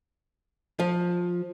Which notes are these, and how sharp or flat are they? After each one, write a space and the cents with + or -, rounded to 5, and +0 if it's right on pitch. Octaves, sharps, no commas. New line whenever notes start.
F3 +15